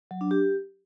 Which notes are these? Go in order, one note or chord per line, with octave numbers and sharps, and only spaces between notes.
F#3
D4
G4